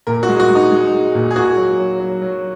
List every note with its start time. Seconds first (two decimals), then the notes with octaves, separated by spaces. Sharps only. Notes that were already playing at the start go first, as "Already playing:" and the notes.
0.07 A#2 A#4
0.23 F#4
0.28 G#3
0.40 F#4
0.50 G#3
0.55 D#4
0.71 G#3
0.93 G#3
1.15 A#2
1.31 G#4
1.36 A#3 F#4
1.57 F#3
1.79 F#3
2.00 F#3
2.22 F#3